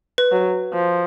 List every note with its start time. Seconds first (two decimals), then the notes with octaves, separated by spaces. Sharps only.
0.18 B4
0.32 F#3
0.73 F3